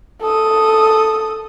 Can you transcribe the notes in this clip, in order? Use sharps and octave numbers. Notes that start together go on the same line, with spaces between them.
A4 D#6